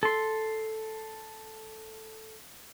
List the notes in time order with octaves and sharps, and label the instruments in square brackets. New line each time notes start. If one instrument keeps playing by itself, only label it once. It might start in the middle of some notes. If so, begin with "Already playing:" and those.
[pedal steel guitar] A4 C6